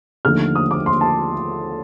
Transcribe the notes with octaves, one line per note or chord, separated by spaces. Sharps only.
D#2 D3 F3 A3 F6
D#6
D6
C6
A5